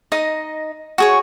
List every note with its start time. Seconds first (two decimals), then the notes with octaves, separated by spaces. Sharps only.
0.12 D#4 D#5
0.98 F#4 G#4 C#5